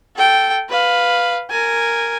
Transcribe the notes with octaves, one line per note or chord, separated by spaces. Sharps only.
A4 G5
B4 F5
A#4 G#5